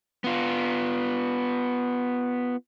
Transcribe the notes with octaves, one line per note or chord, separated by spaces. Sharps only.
B3 F4